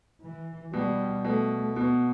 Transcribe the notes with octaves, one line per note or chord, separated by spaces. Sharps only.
E3
B2 G3
B2 A3
B2 B3